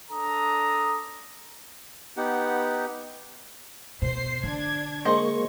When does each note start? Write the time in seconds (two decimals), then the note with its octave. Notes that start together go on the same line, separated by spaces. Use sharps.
0.10 D4 A4 A#5 D#6
2.17 B3 D#4 G4 F#5
4.02 B2 C5 C7
4.43 D3 D4 G#6
5.05 G#3 A#3 G#4 C5 D#5 C#6